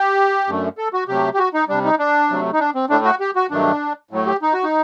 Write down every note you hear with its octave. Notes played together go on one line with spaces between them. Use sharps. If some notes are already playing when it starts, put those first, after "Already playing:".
Already playing: G4
F#2 D3 A3
A4
F#4
C3 F#3 A3 G4
G4
F#4
D#4
C3 G3 D4
D#4
D4
C3 F#3 A3
D#4
D4
C4
A2 A3 D4
F#4
G4
F#4
G2 D#3 F#3 A3 D4
A2 F#3 A3
G4
D#4
F#4
D#4